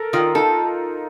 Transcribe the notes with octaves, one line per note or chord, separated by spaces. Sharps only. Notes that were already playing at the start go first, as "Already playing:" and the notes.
Already playing: A4 A#4
D#3 F4
D#4 A4